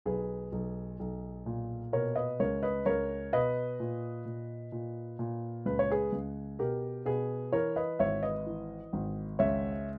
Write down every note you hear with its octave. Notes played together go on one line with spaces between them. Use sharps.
B1 G#4 B4
B1
B1
A#2
B2 A#4 C#5
B4 D#5
C#2 A#4 C#5
B4 D#5
C#2 A#4 C#5
B2 B4 D#5
A#2
A#2
A#2
A#2
C#2 B4
C#5
G#4 B4
C#2
B2 G4 A#4
B2 G#4 B4
E3 A#4 C#5
B4 D#5
G#1 C#5 E5
B4 D#5
E3
G#1
C#2 C#5 E5